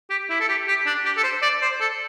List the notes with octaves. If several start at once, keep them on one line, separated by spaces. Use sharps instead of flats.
G4
E4
A4
G4
G4
D4
G4
A4
C5
D5
C5
A4